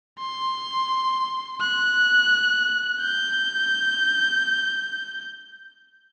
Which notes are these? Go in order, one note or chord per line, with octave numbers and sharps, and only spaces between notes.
C6
F#6
G6